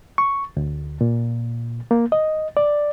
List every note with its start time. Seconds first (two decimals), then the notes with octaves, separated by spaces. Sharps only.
0.18 C#6
0.57 D2
1.01 A#2
1.91 A#3
2.12 D#5
2.57 D5